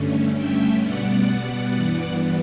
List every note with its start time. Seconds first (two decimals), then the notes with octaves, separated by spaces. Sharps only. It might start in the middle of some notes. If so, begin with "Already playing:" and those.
Already playing: G2 D3 A3 C#4
0.37 E5 G5
0.82 B2 G3 B3 D5 F#5
1.75 G2 E3 B3